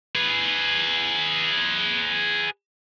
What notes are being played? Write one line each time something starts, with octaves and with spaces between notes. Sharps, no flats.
G#4 B4